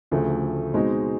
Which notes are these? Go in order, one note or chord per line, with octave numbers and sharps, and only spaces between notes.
D2 C#3 F3 A3
B2 G#3 C4 D#4